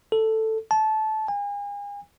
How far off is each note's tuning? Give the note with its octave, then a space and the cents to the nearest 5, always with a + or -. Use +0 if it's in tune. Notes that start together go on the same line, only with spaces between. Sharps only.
A4 +5
A5 -20
G#5 -40